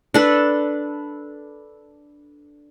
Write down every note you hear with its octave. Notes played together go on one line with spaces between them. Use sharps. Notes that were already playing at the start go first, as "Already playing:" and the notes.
D4 A4 B4